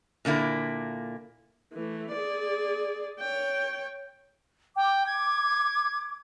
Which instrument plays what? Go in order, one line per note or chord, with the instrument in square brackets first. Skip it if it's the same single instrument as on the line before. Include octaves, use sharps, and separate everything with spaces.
[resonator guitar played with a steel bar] A#2 D3 A#3 E4
[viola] E3 A3
G#4 D5
C#5 G5
[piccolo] G5 [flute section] D6
[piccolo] G#6